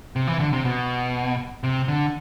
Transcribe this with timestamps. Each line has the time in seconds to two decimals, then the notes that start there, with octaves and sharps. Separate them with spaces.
0.16 C3
0.27 E3
0.40 D3
0.53 C3
0.65 B2
1.64 C3
1.88 D3